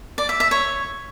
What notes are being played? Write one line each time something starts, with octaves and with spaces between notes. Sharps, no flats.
D5
E5
E5
C#5